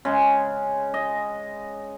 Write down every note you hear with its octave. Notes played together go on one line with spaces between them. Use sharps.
C#3 G#3
D#5